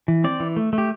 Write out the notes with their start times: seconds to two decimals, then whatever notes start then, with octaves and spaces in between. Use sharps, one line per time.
0.08 E3
0.24 C4 D5
0.40 E3
0.57 A3
0.73 A3
0.78 G4